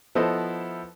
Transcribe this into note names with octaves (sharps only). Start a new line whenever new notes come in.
F3 B3 E4 A4 C5 D#5